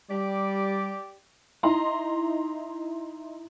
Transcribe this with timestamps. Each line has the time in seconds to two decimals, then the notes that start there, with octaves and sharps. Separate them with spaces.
0.10 G3 G4 D5
1.63 D#4 E4 D#5 A#5 C6